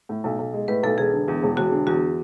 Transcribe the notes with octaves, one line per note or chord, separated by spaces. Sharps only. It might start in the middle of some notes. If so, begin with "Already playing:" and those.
A2
B1
B1
G#3
A2 B4
B1 A4
E1 G#4
D3
E2
E1
E1 F#4
D3
E2 F#4